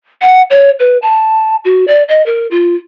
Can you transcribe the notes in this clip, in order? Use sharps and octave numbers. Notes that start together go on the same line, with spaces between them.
F#5
C#5
B4
A5
F#4
D5
D#5
A#4
F4